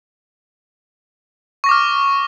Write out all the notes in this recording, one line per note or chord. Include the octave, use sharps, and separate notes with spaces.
C#6 D6 F6 A#6